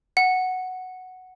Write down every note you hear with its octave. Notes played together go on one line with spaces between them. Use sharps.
F#5